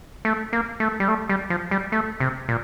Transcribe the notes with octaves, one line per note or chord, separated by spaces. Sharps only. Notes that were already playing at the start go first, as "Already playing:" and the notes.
A3
A#3
A3
G3
A3
G3
F3
G3
A3
C3
A#2